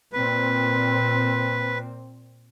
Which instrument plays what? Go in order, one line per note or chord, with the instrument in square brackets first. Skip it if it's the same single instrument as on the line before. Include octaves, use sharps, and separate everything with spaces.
[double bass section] A#2 C4 [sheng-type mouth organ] B4